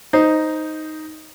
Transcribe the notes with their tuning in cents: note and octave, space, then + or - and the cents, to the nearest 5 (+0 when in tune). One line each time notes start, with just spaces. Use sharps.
D#4 +0 C5 +0